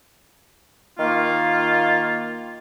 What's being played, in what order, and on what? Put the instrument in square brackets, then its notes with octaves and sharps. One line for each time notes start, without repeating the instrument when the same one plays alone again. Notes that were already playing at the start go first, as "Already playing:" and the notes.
[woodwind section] D#3 A#3 F4